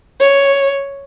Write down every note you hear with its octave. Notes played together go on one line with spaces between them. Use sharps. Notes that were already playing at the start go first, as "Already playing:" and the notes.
C#5